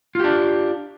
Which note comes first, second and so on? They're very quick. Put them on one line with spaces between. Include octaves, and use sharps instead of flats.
F4 G4 D4